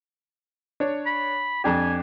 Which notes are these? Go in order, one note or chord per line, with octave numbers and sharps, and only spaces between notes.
D4 C#5
B5
F2 D4 G4 G#5